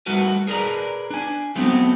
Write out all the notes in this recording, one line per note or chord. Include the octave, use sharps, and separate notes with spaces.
G3 A3 F#4 A#4 B4
G#4 A#4 B4 D5 A#5
D4 G#5
F#3 A3 B3 C4